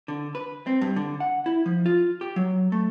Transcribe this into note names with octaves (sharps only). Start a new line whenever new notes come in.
D3
B4
C4
G2
D3
F#5
E4
F3
F4
G4
F#3
A3